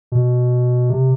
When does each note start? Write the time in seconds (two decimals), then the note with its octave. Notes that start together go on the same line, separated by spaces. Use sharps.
0.12 B2
0.90 C3